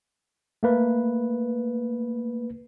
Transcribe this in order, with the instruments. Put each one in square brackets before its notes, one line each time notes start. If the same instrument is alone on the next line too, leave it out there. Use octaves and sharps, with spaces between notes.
[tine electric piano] A3 A#3 B4